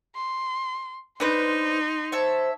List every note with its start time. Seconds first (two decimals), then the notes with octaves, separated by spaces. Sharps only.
0.15 C6
1.20 D4 D#4 B4 C5 C6
2.12 C5 C#5 E5 A5